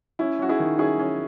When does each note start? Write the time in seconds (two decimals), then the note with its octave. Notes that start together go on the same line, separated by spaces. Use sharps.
0.19 C#4 E4
0.39 C#4 F#4
0.49 E4 G#4
0.60 D#3
0.79 C#4 E4 G#4
0.99 C#4